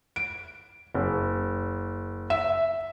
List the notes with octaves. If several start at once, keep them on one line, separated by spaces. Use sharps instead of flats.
D7
F#1
E5